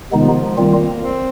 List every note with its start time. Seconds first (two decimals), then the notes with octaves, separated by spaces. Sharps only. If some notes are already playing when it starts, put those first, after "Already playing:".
0.12 C3 D#3 F3 G#3 B3 D#4
0.58 D#3 G3 A#3 C4 F4
1.04 C4